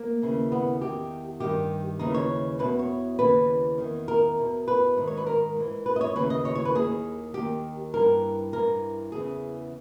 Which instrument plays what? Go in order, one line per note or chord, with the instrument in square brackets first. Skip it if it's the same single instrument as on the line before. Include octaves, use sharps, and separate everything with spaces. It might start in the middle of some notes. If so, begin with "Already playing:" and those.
Already playing: [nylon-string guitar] A#3
D#2 C#3 E3
B3
E2 D#3 G4
G2 D#3 G4
D#2 C#3 E3 D#4
C#5
E2 B2 B4
C#5
D#2 C#3 E3 B4
E2 D#3
A#4
E2 B2
B4
G#2 D#3
C#5
B4
A#4
G#2 E3
B4
D#5
C#5
D#2 C#3 E3 B4
D#5
C#5
C#5
B4
D#2 D#3 G#4
D#2 D#3 G4
G2 E3 A#4
G2 E3 A#4
E2 C#3 E3 G#4